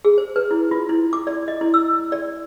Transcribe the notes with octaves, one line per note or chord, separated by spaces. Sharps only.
G#4
C5
B4
E4
F4
E4
D6
D5
D#5
E4
E6
D5